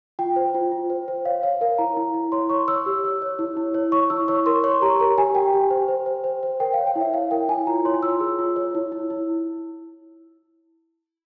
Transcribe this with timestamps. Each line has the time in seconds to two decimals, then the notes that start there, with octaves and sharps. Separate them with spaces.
0.19 F4 G5
0.36 C5
0.54 F4
0.72 F4
0.90 C5
1.08 C5
1.25 C#5 F5
1.42 C#5 F5
1.61 A#4 F5
1.78 E4 A#5
1.97 E4
2.14 E4
2.32 C#5 C6
2.49 C#5 C#6
2.68 C#5 E6
2.86 G4
3.04 C#5
3.22 C#5
3.39 E4
3.57 E4
3.74 C#5
3.92 C#5 C#6
4.10 E4 E6
4.28 C#5 C#6
4.46 A#4 C6
4.64 C#5 C#6
4.82 G4 A#5
4.99 A#4 A#5
5.18 G4 G#5
5.35 G4 G5
5.54 G4
5.70 C5
5.88 C5
6.06 C5
6.24 C5
6.43 C5
6.60 A#4 G5
6.74 C#5 F5
6.87 G5
6.96 E4
7.01 E5
7.14 C#5 F5
7.31 A#4 G5
7.49 E4 G#5
7.67 F4 A#5
7.85 C#5 C6
8.03 F4 E6
8.20 G#4
8.39 F4
8.56 C#5
8.75 E4
8.92 E4
9.10 E4